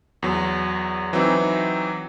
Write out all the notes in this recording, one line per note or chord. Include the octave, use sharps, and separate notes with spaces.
E2 F#3
E3 F#3 C4 D#4